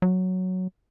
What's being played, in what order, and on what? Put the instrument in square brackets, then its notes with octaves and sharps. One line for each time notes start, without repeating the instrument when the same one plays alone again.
[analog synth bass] F#3